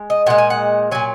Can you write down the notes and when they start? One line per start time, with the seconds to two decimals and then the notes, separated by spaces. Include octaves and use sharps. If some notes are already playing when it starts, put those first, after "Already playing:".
Already playing: G#3
0.10 D#5
0.26 A#2 G#3 F#5
0.38 G#5
0.50 F#5
0.91 A#2 F#3 G#5